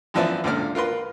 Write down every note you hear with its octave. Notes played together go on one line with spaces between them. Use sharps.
F#2 E3 F3 B3 D5 E5
C#2 A#2 D3 D4 D5 F6
F4 A#4 B4 C6